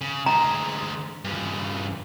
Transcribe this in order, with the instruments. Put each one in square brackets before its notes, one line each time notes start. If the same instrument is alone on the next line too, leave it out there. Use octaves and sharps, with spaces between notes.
[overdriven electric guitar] C#3
[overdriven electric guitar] D2 G#3 [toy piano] A#5
[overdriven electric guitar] G2 C#3